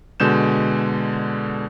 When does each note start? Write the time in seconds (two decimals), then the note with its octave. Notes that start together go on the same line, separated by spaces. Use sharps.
0.20 B2 D3 G#3 G6 E7